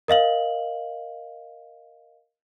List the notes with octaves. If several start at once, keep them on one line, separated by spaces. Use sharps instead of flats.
A#4 D#5 F5 F#7